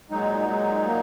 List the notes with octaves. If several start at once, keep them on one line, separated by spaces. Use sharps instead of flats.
A#2 F#3 G#3 D#4
G#3
A#3